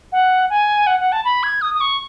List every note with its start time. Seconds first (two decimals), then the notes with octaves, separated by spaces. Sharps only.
0.12 F#5
0.50 G#5
0.87 F#5
1.00 F#5
1.12 A5
1.25 B5
1.43 G#6
1.62 D#6
1.74 D#6
1.81 C#6